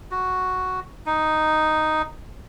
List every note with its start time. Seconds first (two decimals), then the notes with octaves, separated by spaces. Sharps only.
0.11 F#4
1.06 D#4